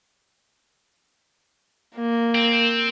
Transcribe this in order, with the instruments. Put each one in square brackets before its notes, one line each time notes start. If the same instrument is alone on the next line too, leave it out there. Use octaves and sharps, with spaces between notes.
[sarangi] A#3
[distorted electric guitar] C4